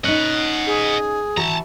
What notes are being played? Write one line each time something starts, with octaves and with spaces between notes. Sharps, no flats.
C#4 D#4 D#5 F#5
G#4
E3 F#4 A5 A#5